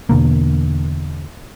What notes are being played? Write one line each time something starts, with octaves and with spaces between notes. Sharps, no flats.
E2 B2 D3 A#3